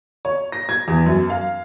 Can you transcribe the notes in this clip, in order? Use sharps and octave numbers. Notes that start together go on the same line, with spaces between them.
C#5
A#6
G#6
E2
F#2
F5